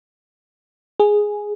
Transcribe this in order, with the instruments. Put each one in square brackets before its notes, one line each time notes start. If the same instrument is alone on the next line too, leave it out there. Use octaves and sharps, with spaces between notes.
[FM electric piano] G#4